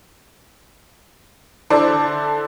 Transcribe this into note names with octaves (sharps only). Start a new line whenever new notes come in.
D3 E4 A4 C5 D5